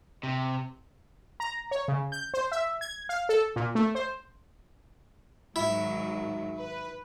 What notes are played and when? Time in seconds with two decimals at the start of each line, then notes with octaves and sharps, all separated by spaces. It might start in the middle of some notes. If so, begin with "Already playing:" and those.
0.23 C3
1.40 A#5
1.71 C#5
1.88 C#3
2.12 G6
2.34 C5
2.52 E5
2.81 G#6
3.09 F5
3.29 A4
3.56 A#2
3.75 A3
3.95 C5
5.56 G#2 D#3 F#3 E4
6.57 B4